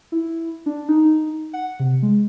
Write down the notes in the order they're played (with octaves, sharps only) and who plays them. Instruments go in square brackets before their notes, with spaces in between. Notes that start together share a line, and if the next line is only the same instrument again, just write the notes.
[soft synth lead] E4
D4
D#4
F#5
C3
G#3